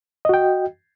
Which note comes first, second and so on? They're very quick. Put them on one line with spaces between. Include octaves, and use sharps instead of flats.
D#5 F#4 G5